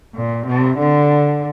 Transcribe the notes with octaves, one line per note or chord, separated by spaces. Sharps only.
A#2
C3
D3